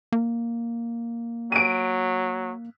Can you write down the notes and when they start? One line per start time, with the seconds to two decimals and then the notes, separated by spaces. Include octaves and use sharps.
0.12 A#3
1.52 F#3 D7 D#7